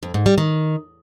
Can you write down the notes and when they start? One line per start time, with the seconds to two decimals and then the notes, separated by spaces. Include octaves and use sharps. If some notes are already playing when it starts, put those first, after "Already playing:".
0.03 F2
0.14 G#2
0.26 G3
0.38 D#3